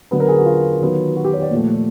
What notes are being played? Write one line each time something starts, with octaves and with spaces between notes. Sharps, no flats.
D3 F#3 B3 B4
A#4
G#4
F#4
F4
D#3 F#3 B3
F#4
G4
C#5
D5
A#2 F3 A3